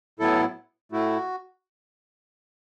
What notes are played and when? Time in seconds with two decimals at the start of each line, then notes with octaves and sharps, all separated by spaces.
0.19 A2 F#3 B3 E4 A4
0.92 A2 A3 E4 F#4